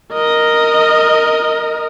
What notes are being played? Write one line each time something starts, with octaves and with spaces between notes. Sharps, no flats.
A#4 D#5